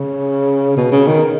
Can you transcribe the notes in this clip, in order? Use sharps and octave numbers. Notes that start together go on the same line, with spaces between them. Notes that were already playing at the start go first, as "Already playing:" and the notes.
Already playing: C#3
B2
C#3
D#3